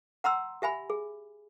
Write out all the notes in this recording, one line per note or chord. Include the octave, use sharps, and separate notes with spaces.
F#5 A#5 C6 E6
G4 E5 G#5 B5
G#4